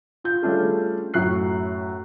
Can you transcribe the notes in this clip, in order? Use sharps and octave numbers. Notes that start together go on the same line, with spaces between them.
F4 G6
G3 A3 C#4 D4 F4 G#4
F#2 A2 C#6 F#6 C7